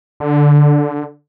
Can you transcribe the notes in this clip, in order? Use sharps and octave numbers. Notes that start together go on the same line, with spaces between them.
D3